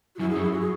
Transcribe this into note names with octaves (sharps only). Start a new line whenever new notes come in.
F#4
F#2 E4
G#4
F#2
E4
F#4
G#4